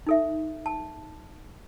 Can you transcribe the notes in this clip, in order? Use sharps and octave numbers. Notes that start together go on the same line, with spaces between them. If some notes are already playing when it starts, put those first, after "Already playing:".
D#4 A4 E5
A5